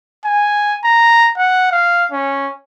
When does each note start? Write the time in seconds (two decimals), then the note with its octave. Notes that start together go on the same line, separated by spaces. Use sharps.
0.25 G#5
0.84 A#5
1.37 F#5
1.72 F5
2.11 C#4